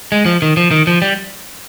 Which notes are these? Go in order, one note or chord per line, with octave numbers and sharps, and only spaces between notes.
G#3
F3
D#3
F3
D#3
F3
G3